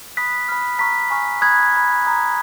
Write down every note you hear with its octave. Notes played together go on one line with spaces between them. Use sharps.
B5 D#6 F#6 B6
B5 F6
A#5 C#6 F6 B6
G#5 C#6 F6
B5 D#6 F#6 G#6
B5 F6
A#5 D#6 F#6